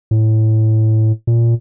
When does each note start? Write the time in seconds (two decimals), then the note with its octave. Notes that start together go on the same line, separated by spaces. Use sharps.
0.11 A2
1.27 A#2